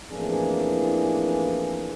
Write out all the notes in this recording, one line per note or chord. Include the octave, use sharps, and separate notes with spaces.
A1 F2 E3 A#3 D4 G#4